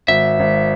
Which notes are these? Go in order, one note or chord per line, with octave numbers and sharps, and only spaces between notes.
G#1 E5
G#1